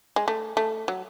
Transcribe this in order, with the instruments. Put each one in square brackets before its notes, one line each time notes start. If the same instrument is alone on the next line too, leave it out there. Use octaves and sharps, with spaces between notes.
[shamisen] G#3
A3
A3
F#3